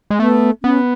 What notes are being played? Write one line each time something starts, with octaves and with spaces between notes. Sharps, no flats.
G#3
A3 B3
B3 C#4